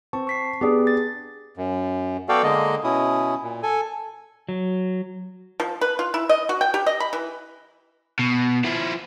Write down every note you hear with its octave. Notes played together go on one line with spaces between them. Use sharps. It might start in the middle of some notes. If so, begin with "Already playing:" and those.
C4 A5 C#6
C#6 B6 C7
B3 D4 G4 G#4
A6
F#2
B3 F#4 A4 D5 F5 G5
D3 G#3 A#3 D#5
B2 C#4 E4 D#6
A#2
A4 G#5
F#3
F3
B4
F4
E4
D#5
F#4
G5
G4
D#5
B5
E3
B2
F3 E4